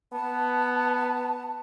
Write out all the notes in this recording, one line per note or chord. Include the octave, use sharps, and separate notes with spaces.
B3 A5